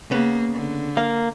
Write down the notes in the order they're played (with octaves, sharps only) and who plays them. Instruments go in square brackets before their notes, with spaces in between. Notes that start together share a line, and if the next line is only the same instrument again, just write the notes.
[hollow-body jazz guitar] C#3 B3 [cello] A#3
[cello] D3
[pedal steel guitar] A#3 [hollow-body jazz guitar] F5